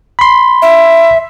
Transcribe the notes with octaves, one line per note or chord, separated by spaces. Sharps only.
B5 C6
E5